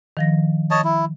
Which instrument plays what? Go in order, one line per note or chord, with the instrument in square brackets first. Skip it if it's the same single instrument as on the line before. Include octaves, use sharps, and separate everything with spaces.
[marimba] D#3 F3 A#6
[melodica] C#5 D#5 A5
E4